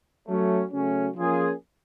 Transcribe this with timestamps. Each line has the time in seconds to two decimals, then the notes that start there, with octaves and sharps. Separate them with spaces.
0.27 F#3 A3 C#4
0.71 C#3 F#3 A3 C#4
1.15 F3 A#3 C#4 F4 G#4